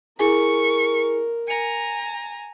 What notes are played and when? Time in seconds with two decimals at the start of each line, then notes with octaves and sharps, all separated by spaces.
0.19 E4 G#4 A#4 G#5 C#6
1.48 G#5 A#5 C#7 F7